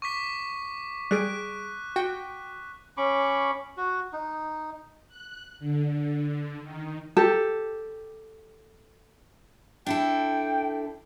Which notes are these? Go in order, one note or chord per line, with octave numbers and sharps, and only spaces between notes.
C#6 D6 B6
G3 G#4 F#6 D7
F#4 G5
C#4 B5 C#6 D6
F#4
D#4
F#6
D3
D#3
G4 A4
D4 E4 A4 G5